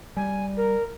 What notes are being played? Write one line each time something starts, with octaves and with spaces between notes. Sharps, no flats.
G3 G#5
A#4